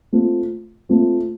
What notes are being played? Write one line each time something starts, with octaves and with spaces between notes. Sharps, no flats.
A3 C4 F4
A3 C4 F4